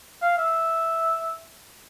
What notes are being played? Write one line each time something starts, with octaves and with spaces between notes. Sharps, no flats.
F5
E5